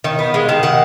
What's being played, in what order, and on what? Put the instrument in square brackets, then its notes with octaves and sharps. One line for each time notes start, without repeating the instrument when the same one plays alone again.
[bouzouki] D#3
B3
G#3
D#3
D#3 F#5